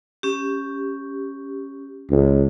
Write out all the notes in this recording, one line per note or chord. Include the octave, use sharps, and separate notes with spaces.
C#4 G4
C#2